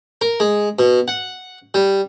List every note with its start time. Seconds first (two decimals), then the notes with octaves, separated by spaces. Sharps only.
0.21 A#4
0.40 G#3
0.79 B2
1.08 F#5
1.74 G3